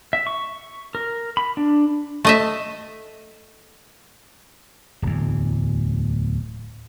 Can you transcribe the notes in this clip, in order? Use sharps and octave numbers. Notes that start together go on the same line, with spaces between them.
E5
C#6
A#4
B5
D4
A3 D#5 E5
D1 E2